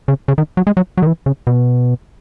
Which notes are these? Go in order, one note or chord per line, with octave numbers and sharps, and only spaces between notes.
C#3
C#3
D#3
F#3
G#3
F#3
F#3
D#3
E3
C#3
B2